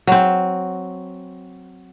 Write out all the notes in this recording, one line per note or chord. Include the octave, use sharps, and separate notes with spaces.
F#3 C4